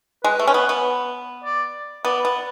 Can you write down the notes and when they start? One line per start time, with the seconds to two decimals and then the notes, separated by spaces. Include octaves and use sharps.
0.24 G#3 B4
0.39 A3
0.48 C#4
0.54 B3
0.69 B3
1.44 D5
2.05 B3 D5
2.25 B3